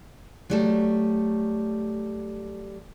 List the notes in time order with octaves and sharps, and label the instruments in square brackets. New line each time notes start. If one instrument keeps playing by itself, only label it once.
[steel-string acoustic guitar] F#3 G3 A3